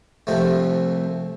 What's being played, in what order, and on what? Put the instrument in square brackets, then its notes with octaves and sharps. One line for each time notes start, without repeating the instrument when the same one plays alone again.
[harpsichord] C2 C3 F3 A3